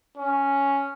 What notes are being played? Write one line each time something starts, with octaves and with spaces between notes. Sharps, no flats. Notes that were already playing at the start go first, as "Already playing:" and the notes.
C#4